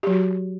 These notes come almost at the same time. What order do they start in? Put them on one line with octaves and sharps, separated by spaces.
G4 F#3 F#4